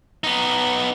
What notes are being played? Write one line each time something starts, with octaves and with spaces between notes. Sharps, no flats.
B3 D#4